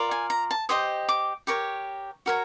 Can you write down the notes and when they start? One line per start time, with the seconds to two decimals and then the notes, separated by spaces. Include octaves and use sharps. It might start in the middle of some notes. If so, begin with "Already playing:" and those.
Already playing: F4 A#4 D5
0.11 G#5
0.30 A#5
0.51 A5
0.69 G4 C5 D#5 D#6
1.09 D6
1.47 G4 A#4 C#5 C#6
2.26 F#4 A#4 C#5